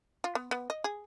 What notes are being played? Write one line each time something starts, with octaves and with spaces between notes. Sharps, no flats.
F4
B3
B3
D#5
G#4